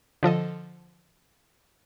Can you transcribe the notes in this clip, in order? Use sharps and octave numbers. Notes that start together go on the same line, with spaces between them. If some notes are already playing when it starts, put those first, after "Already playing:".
D3 F3 A4 D#5